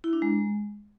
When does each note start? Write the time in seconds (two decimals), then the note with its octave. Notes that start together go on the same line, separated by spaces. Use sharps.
0.04 E4
0.13 D4
0.22 G#3